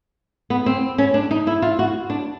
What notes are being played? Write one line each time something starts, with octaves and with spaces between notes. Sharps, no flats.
B3
C4
C#4
D4
D#4
E4
F4
F#4
D4